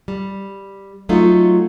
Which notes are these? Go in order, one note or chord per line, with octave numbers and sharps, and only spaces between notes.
G3
F#3 A3 D#4 F4